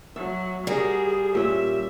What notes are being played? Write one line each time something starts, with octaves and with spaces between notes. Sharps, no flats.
F#3 E5
G3 F#4 G#4 A#4
A#2 C#4 E5